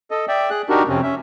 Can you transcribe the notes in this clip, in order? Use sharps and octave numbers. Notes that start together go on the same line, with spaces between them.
A4 D#5
D5 E5 G5
G#4 F#6
D4 D#4 F#4 G4 A#4
F2 C3 C4 C#4
C#4 E5